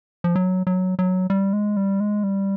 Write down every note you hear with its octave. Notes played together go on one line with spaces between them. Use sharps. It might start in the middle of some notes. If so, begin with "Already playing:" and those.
F3
F#3
F#3
F#3
G3
G#3
G3
G#3
G3